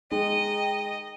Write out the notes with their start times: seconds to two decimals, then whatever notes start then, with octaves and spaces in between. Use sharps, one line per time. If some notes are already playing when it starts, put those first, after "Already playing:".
0.12 G#3 D#4 D#5 G5